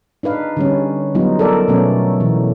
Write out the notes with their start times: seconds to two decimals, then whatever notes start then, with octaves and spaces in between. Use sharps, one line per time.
0.23 D4 D#4 B4 F5
0.57 D3 G3 C#4
1.15 F#3 G3 B3 D#4 F4
1.39 A4 A#4 D5
1.68 B2 F#3 A3 B3 C#4
2.20 B2 E3